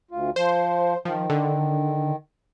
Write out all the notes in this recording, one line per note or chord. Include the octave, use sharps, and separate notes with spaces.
D2 F4
F3 C5
D#3 F3
D3